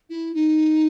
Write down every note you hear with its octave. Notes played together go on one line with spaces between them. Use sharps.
E4
D#4